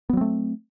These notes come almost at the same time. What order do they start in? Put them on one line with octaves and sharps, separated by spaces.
B3 F#3 C4 A3